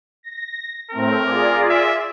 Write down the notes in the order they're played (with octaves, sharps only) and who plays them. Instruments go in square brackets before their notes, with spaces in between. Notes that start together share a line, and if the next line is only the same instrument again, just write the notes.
[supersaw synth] A#6
[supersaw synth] A2 A3 C4 [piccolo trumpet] A#4
[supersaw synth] F4 G#4 D5
[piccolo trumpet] E5